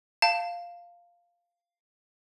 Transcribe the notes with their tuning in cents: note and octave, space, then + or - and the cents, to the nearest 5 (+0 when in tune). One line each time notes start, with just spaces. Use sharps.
F5 +0 A5 +25